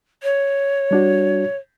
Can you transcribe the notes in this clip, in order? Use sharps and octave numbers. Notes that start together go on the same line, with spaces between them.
C#5
G3 D4 F#4